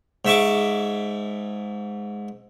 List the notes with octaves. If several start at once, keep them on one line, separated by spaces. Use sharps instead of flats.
G#2 E5 C#6 D6